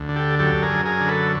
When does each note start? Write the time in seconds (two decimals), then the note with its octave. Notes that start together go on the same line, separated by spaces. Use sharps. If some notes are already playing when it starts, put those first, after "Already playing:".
Already playing: D2
0.09 D3
0.16 G4 A4
0.39 F#2 G4 A4
0.62 G#4 A#4
0.70 F#2
0.85 G#4 A#4
1.01 D3
1.08 A4 B4